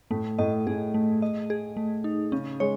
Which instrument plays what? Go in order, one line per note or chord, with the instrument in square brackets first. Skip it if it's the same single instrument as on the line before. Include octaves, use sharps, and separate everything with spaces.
[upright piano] A2 [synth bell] A3
[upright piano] A2 [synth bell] D#5
[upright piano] A2 [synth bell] G#4
[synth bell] A3
D#5
G#4
A3
D#4
[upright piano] C#3 [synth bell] C#4
[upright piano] G#3 [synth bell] C#5